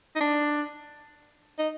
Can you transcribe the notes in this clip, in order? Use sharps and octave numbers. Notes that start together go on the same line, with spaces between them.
D#4
D4
D#4